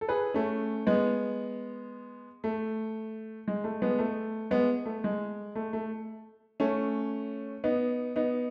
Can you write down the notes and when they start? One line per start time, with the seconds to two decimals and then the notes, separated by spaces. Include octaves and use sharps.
0.01 A4
0.09 G#4 B4
0.34 A3 C#4
0.87 G#3 B3
2.44 A3
3.48 G#3
3.64 A3
3.82 G#3 B3
3.99 A3
4.51 G#3 B3
4.86 A3
5.04 G#3
5.55 A3
5.73 A3
6.60 A3 C#4
7.64 B3 D#4
8.16 B3 D#4